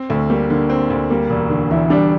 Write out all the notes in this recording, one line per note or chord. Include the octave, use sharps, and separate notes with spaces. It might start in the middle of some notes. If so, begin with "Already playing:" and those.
Already playing: C4
D2 A3
G3 A#3
D3 A#3
C4
D2
G3 A#3
E1
D3
E2 E4
G3 D4